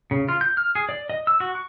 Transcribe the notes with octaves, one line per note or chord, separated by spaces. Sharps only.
C#3
F4
G6
F6
G#4
D5
D#5
E6
F#4
C#6